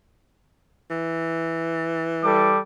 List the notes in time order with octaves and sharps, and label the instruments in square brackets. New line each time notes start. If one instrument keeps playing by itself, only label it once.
[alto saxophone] E3
[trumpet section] G3 A4 D6